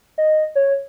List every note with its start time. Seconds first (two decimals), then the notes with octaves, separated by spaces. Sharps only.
0.18 D#5
0.55 C#5